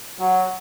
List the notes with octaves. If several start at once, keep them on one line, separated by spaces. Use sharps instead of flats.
F#3